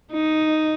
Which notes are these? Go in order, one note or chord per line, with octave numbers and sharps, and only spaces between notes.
D#4